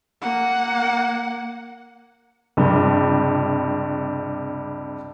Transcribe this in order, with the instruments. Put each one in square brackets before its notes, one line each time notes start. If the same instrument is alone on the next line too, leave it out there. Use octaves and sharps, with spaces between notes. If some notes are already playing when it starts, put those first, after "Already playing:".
[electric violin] A#3 F#5
[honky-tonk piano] C#2 G2 C3